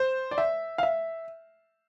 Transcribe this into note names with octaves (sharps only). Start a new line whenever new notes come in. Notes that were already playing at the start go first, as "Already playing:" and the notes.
Already playing: C5
D5
E5
F5
E5